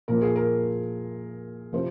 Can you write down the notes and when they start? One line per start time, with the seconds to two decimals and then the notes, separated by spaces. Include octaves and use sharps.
0.08 A#2 F3 A#4
0.22 G#4
0.36 A#4
1.73 C3 F3 C5